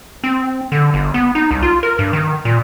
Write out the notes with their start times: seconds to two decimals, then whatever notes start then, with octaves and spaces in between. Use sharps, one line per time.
0.24 C4
0.72 D3
0.94 G1
1.14 B3
1.35 D#4
1.51 C2
1.62 F4
1.83 A#4
1.99 G2
2.13 D#3
2.45 A#2